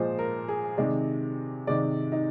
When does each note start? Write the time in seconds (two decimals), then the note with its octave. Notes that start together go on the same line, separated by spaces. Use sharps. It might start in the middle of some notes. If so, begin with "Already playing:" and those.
Already playing: A#2 F3 G#3 C5
0.19 A#4
0.48 G#4
0.77 C3 D#3 G#3 D5
1.67 C3 D#3 G#3 D5
2.12 D#4